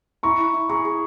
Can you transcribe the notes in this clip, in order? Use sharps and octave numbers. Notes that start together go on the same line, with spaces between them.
E4 A#5 C#6
E4
E4
G#4 A#5 C#6
G#4